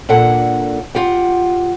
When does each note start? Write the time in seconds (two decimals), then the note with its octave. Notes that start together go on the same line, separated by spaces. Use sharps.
0.09 A#2 D4 A4 F#5
0.95 F4 G4 F#5